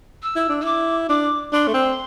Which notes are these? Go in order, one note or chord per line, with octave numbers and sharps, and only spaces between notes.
E6
E4
D4
E4 D6 E6
D4 D6
D4 C6
A3
C4